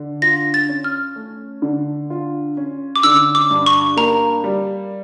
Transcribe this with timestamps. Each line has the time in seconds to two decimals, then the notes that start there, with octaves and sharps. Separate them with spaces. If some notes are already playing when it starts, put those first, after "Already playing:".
Already playing: D3
0.22 F4 A#6
0.54 A6
0.69 C#4
0.84 F6
1.16 A3
1.62 D3
2.10 F4
2.57 C#4
2.96 D6
3.03 D3 E6
3.35 D6
3.50 G2
3.66 C#6
3.97 A#3 A#5
4.44 G3